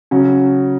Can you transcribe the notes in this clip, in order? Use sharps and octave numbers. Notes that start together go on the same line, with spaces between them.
C#3 F#3 C#4